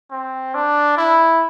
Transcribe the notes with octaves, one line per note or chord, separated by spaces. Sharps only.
C4
D4
E4